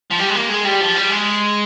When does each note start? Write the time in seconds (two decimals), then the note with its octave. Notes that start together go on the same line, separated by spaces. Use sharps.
0.11 F3
0.19 G3
0.29 G#3
0.35 A#3
0.49 G#3
0.64 G3
0.81 F3
0.96 G3
1.10 G#3